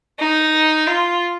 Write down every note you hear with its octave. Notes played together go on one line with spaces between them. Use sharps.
D#4
F4